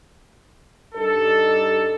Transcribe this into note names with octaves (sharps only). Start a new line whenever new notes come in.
G2 G3 D#4 A4